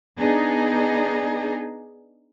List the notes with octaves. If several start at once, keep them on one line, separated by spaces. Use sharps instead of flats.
B3 D4 D#4 G#4